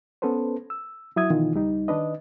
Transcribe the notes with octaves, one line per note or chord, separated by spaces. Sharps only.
B3 C#4 A4 B4 C5
E6
F#3 E4 E5 D#6 G#6
B2 D#3 E3 D#4 F4
C#2 G3 D#4
D#3 D4 B4 D#5